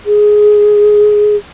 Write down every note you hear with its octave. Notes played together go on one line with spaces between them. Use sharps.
G#4